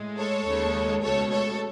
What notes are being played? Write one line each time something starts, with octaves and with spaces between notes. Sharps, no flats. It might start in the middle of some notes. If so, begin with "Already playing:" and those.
Already playing: A2 G#3
A4 C#5
D#2 C#3 G#3
C#2 B2 A3 A4 C#5
A4 C#5